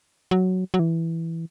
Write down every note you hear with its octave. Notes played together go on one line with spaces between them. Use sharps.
F#3
F#3
E3